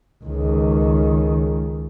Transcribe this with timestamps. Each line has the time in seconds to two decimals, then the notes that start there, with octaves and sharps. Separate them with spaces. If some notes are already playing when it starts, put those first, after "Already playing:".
0.25 C#2 D#3